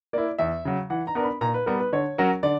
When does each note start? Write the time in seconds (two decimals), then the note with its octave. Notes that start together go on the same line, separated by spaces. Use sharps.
0.13 A#3 E4 D5
0.38 E2 E5
0.65 C#3 F#3
0.90 E3 F#5
1.07 A#5
1.15 B3 D4 A#4
1.24 B5
1.41 A#2 A#5
1.54 B4
1.66 G3 B3 A#4
1.80 B4
1.93 D3 C#5
2.18 F#3 C#4 F#4 A#4
2.43 D3 D5